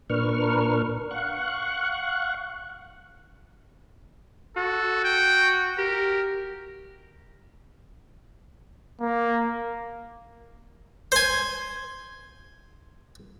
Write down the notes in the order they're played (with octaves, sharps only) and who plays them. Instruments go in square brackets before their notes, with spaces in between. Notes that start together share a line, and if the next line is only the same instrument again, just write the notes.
[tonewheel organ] A#2 D4 A#4 B4 C#6 F6
F5 F#5 C#6 F#6
[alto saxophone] F#4 [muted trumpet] A4
[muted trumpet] G5
[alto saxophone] G4 [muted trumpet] A#4
[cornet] A#3
[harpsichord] C5 G#5